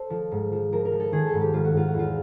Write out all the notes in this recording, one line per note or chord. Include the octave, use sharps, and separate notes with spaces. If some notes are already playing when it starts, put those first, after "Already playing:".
Already playing: A4 C5
F3
G#2
F3
F3 A#4
A#4
F3
A4
D#3 G#4
A4
G#2
G4
G#2 F4
F#4
G#2 F4
F#4
E2
F4